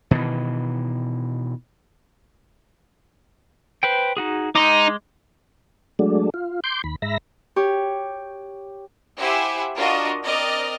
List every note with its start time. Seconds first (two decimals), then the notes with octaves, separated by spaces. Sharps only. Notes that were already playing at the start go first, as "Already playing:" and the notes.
0.11 B2 D#3 E3
3.83 B4 C5 G5
4.17 D#4 F#4 G#4
4.55 G#3 D#4 C6 D6
5.99 F#3 G#3 A3 D4
6.34 F4
6.64 C6 D6 G6
6.84 D#2 B5
7.02 G#2 E5 A#5 B5 A#6
7.56 G4 C#5
9.18 E4 G4 C5 E5 F#5 G#5
9.76 D4 F4 F#4 A#4 D#5
10.24 C4 A#4 D5 D#5 F6